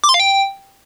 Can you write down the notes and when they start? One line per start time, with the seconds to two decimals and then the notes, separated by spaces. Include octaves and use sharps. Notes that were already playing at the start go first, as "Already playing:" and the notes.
0.04 D6
0.09 C6
0.14 F5
0.20 G5